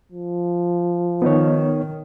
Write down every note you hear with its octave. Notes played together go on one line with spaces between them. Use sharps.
F3
D#3 B3 D#4 C#5